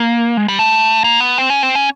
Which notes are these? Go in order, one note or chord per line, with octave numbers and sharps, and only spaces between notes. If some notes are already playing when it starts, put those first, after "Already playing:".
Already playing: A#3
G#3
G3
A3
A#3
B3
C4
C#4
C4
C#4